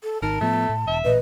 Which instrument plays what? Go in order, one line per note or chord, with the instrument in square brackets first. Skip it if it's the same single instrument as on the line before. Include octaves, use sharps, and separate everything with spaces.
[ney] A4
[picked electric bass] G#1 D#3 [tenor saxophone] A#4 [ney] A5
[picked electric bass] A2 F3 B3 [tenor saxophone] A3
[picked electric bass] A2
[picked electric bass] E1 [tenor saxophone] E5
[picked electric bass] A1 A#2 [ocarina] B4 [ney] D#5